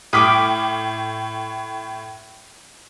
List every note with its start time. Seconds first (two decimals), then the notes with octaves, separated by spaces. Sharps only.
0.13 A2 G5 D6 D#6 F6 B6